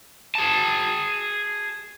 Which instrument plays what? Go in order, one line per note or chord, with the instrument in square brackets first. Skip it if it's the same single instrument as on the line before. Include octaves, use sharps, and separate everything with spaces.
[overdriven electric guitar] G#4 A5